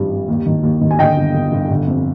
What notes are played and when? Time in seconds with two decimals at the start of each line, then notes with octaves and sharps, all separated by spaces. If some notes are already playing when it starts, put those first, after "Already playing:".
Already playing: G#1 G2 F3
0.11 G2
0.29 D#2
0.46 D#3
0.63 D#2
0.81 D#3
0.91 G#5
0.99 D3 D#5 G5
1.17 G1
1.35 G1
1.52 G1
1.70 D3
1.87 F2